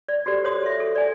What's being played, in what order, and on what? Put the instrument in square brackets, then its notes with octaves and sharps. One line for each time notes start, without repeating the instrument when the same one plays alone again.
[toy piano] D5
F#4 G4 A4 C5 D5
F#4 C5 C#5 C6 D#6
A4 E5
A4
D5 G#5